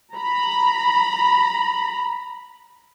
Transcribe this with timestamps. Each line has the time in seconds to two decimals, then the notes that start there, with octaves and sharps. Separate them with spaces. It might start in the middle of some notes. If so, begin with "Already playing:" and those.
0.14 A#5 B5